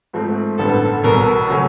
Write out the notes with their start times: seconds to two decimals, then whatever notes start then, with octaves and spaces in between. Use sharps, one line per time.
0.13 G#2 F3 A3 C4
0.58 A1 G2 D3 G3 B3 A4
1.03 B1 B2 G3 A#4
1.49 C#3 F#3 A3 C#4